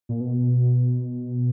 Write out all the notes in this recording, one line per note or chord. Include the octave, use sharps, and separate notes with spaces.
A#2
B2